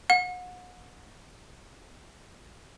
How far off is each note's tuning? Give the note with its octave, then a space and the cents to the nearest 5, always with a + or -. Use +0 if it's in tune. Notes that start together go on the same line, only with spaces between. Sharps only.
F#5 -35